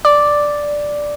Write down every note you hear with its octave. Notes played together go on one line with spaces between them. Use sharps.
D5